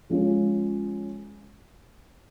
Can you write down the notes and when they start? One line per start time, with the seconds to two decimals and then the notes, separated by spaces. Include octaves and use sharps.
0.10 F3 G#3 C#4 F4